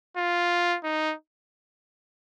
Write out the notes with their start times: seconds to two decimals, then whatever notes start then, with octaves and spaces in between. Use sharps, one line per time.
0.17 F4
0.84 D#4